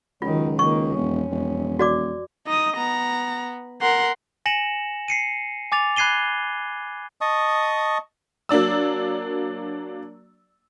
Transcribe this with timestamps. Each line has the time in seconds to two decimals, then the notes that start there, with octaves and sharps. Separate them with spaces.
0.22 C#2 D#3 F#3 F4
0.59 D#3 A#3 C#6
0.96 E1 F2 C#4
1.31 E1
1.79 F#4 D5 D6
2.47 D#4 D#5 D#6
2.77 B3 A#5
3.82 A#4 F#5 C6
4.46 G#5 A#6 C#7 E7 F#7
5.08 C7 C#7 D#7
5.72 G#5 D6 A6 F7
5.96 B5 F#6 G#6 C7 D#7 G7
7.21 D#5 A5 C#6 D#6
8.49 F#3 A#3 D4 D5 E6